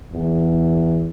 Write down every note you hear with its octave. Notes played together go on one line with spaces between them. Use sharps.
E2